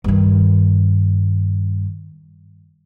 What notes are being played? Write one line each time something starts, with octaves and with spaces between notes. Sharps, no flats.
G2 D#3